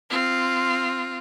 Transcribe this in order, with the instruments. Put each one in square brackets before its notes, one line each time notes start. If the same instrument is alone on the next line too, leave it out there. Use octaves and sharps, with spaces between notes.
[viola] C4 F4